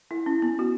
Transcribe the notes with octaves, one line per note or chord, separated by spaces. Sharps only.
E4
C#4
B3
F#4